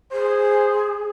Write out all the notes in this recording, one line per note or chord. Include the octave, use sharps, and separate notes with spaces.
G#4 C5